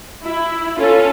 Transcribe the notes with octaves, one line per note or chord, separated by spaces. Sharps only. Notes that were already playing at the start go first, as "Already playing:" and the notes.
E4
C#4 F4 A4